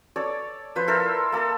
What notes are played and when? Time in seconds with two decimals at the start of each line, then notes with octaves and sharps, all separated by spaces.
0.16 A4 C#5 D5
0.76 F3 B4 C5
0.87 E4 A4 A#4 C5
1.32 A#3 A4